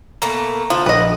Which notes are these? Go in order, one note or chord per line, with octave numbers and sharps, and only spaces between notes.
B2 A3 A#3 A#5
D3 F3
A#1 B4 D#5